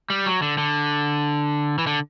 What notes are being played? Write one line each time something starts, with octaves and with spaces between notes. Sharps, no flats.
G3
F#3
D3
D3
E3
D3